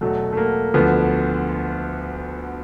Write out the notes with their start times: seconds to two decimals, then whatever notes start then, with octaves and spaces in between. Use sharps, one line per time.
0.01 E2 B2 F#3 A3
0.32 A3
0.37 A#3
0.74 D2 D3 F3 B3